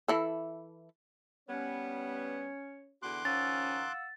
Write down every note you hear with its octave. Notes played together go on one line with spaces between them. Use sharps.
E3 E4 A4
G3 B3 C#4 C#5
E2 D3 F#4 C6 D6 F#6
D#3 F3 C#4 F5 F#5 E6 A6